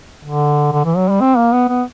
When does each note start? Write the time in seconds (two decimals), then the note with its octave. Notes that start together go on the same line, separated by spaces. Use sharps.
0.25 D3
0.73 D3
0.85 E3
0.97 F#3
1.09 G3
1.21 C4
1.37 A#3
1.53 B3
1.69 B3